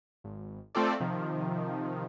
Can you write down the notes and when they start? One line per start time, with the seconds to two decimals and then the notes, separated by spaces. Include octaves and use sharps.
0.24 G#1
0.75 A3 C4 F4 A4 D5
1.00 C3 D#3 F3